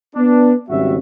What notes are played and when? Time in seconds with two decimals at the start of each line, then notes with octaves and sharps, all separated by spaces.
0.16 B3 D4
0.70 G#1 C#3 G3 F#4 E5